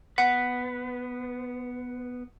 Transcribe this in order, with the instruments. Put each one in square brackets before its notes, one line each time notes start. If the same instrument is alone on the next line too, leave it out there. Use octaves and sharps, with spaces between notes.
[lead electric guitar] B3 B4 [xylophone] F#5